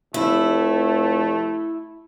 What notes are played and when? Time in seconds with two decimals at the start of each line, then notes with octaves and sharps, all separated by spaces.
0.14 F1 A3 E4